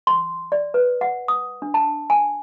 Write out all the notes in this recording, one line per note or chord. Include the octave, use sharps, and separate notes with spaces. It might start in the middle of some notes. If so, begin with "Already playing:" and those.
C6
D5
B4
F#5
D#6
D4
A5
G#5